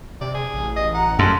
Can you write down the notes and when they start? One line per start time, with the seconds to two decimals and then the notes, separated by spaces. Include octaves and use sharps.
0.21 C3 D5
0.34 G#4
0.54 A1
0.76 D#5
0.94 F#5 A#5
1.19 F#2 A4 C6